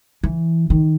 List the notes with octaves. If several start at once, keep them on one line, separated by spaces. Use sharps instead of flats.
E3
D#3